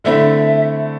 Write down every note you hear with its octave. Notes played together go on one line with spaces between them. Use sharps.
D3 A3 C4 E4 E5